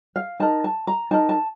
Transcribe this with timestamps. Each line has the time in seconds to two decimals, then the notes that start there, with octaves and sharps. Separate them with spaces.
0.16 F5
0.40 D#4 A#4 A5
0.64 A5
0.87 A#5
1.11 D#4 A#4 A5
1.29 A5